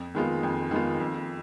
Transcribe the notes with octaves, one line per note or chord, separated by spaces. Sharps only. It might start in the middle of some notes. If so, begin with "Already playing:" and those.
Already playing: F2
D#3 G#3 B3 F4
F2
D#3 G#3 B3 F4
F2